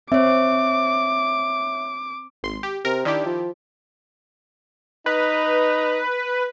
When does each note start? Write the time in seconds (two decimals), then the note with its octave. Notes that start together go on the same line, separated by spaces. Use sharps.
0.12 C4 C#5 E5 D6
2.43 G#1 C6
2.63 G4
2.85 C3 A#4
3.05 D#3 D4 E4 G4
3.25 F3
5.06 D#4 B4